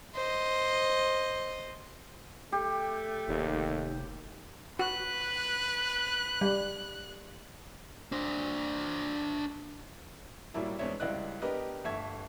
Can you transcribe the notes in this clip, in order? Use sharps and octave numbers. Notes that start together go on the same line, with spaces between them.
C5 D#5
A3 G4
F1 D#2
F#4 B4 F#6
G3
D4 C5
A2 F#3 G3 A#3 E4
E2 G#3 C4 D4 C#5 E5
C#2 G3 E4 D5 D#5 F#6
B3 D4 G4 A#4 B4 D#5
G1 A3 E5 C#6 G#6